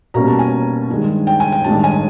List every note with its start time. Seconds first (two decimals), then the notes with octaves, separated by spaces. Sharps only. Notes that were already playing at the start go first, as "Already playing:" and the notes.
0.14 B2 G3 A#3 C#4 A#5
0.28 A5
0.39 G#5
0.90 G2 D#3 G#3
1.27 G5
1.40 G#5
1.52 G5
1.64 A1 G2 D#3 G#3 A5
1.84 G#5